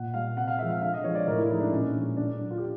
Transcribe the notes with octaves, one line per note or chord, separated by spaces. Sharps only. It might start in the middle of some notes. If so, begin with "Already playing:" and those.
Already playing: A#2 F#5
G3 F5
C3 F#5
F5
F3 G#3 E5
F5
D3 F5
D#5
F3 G#3 C#5
D5
A2 A#4
E4
F3 G#3 D#4
D4
A#2 C#4
F3 G#3
D3 D4
D4
F#3
F4
G4